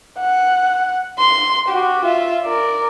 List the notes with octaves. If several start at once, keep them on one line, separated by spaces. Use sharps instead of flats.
F#5
C6
F#4 G4
F4 E5
A#4 D5